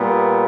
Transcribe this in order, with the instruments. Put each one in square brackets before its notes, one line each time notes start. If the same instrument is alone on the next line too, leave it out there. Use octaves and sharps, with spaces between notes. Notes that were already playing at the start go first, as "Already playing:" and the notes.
Already playing: [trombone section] A#2 G3 B3